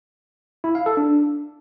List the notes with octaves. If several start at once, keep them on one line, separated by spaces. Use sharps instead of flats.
E4
F5
A4
D4